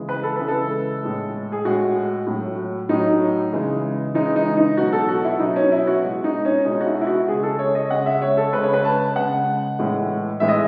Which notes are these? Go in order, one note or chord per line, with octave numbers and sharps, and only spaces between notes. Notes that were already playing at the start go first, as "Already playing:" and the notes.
Already playing: C#3 E3 G#3
B4
A4
C#3 E3 G#3 B4
A4
A2 G#3
G#4
A2 G#3 F#4
A2 F#3
A2 F#3 D#4
C#3 E3 G#3
C#3 E3 G#3 D#4
D#4
D#4
B2 F#3 F#4
A4
F#4
E4
B2 F#3 D#4
C#4
E4
F#4
B2 G#3
D#4
C#4
B2 G#3 D#4
F#4
E4
E4
F#4
C#3 G#3 G#4
A4
C#5
D#5
C#3 G#3 F#5
E5
C#5
A4
C#3 G#3 B4
C#5
B4
A5
C#3 G#3 F#5
A2 E3 G#3
A2 E3 G#3 E5
D#5